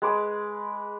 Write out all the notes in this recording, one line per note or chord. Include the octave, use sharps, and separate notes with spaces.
G#3 B4 D6